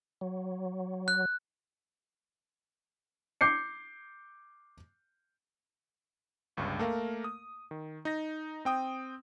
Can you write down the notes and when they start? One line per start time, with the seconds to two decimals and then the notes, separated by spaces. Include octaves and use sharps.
0.21 F#3
1.08 F#6
3.41 D6 G6 C7 C#7
6.57 G1 C#2 G2
6.79 A3 A#3 A#4 F5
7.24 D#6
7.71 D#3
8.05 D#4 A#6
8.65 C4 G5 D#6